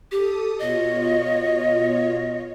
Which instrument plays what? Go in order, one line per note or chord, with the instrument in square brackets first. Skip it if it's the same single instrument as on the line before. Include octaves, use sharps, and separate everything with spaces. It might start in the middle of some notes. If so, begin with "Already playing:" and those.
[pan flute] G4 [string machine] A4 D#6
[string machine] B2 F4 C#5 [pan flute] D#5